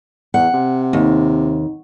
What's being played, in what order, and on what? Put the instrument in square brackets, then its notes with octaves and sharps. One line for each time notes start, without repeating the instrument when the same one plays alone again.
[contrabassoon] E2 [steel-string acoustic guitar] F#5
[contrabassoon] C3
[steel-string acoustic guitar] D#2